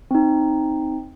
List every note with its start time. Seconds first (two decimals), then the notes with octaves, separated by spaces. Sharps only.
0.11 C4 D#4